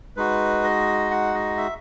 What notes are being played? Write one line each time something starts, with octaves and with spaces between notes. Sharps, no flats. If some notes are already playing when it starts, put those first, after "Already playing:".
G#3 D#4 F#4 B4
D#5
F#5
D#5
E5